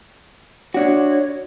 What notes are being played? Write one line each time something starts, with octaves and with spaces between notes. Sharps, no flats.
D4 F#4 C#5